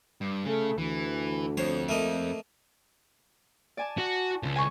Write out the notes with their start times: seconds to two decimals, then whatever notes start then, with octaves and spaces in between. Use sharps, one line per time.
0.21 G2
0.45 C#3 A3 C#4
0.78 D2 E3
1.57 F2 C5 C#5
1.89 A3 A#3 D#5
3.77 D5 G#5 A5
3.98 F#4
4.43 C#2 C#3
4.56 G#5 C#6